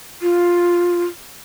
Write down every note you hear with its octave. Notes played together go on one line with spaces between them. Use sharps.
F4